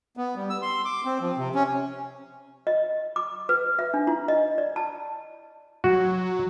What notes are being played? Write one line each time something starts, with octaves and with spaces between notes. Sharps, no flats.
B3
G3
E6
C6
D6
C4
F3
C3
C#4
D#5
D6
B4
E5
D4
E4
D#5
D5
A5
F#3 F#4